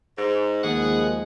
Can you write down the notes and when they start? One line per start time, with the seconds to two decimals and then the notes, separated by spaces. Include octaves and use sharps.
0.17 G#2
0.63 D#2 F3 G#3 B3 G#4 F#5